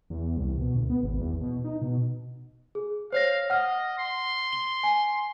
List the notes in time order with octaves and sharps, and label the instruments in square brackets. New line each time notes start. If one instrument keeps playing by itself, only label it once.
[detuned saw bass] E2
C2
B2
D2
B3
G#1
E2
B2
D#4
B2
[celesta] G#4
[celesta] C5 C#5 A#6 [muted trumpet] F5
[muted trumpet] D#5 [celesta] F#5 F6
[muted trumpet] C6
[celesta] G7
G#5